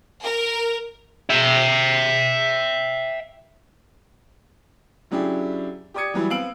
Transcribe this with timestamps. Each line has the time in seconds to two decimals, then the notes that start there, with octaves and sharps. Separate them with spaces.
0.23 A#4
1.30 E5 G5
5.11 C#3 F#3 D4 E4 G4 G#4
5.94 G4 D5 D6 D#6 G#6 C#7
6.14 E3 F#3 G3 E4
6.30 B3 C4 F5 E6 D7 F#7